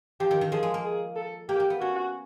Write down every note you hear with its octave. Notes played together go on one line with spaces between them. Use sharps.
F3 G4
D#3
D#3
F3 G#4
G#3
A#3
G#4
A4
A#3 G4
A#3
B3
C#4 F#4